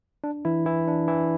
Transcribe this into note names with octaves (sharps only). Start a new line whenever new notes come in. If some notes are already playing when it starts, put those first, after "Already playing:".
D4
E3 E4
E3 E4
D4
E3 E4